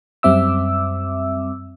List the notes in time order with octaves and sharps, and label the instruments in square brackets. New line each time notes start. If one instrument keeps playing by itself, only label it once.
[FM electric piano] F#2 G3 C4 E5 D6 E6